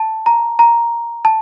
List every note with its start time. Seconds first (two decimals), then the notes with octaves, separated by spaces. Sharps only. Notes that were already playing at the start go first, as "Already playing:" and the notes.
Already playing: A5
0.26 A#5
0.59 A#5
1.25 A5